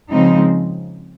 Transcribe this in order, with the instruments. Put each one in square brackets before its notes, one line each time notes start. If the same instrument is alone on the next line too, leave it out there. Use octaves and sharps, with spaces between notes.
[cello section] C#3 F3 G#3 C4 D#4